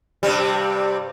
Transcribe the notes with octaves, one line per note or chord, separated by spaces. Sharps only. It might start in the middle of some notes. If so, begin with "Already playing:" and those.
G2 C3 G3